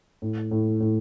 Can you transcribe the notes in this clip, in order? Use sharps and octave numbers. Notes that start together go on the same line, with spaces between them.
A2
A2
A2